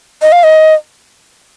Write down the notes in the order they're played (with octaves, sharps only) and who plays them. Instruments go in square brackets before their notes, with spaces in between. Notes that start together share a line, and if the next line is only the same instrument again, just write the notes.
[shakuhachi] D#5
F5
D#5